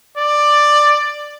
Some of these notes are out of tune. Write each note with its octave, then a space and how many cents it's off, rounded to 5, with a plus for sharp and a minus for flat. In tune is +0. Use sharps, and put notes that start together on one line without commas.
D5 +10